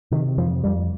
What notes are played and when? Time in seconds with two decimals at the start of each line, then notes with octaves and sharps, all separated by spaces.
0.11 C3 D#3
0.38 F2 F3
0.64 F2 G3